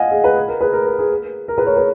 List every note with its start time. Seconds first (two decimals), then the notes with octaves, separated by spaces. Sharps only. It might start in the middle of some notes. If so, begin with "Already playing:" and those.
Already playing: D#5 F5 F#5 G#5
0.11 G#4
0.23 G#4 B4
0.36 G#4
0.48 A#4
0.61 G#4 B4
0.73 A#4
0.86 A#4
0.99 G#4
1.48 A#4
1.57 G#4 B4
1.66 A#4 C#5
1.76 G#4 B4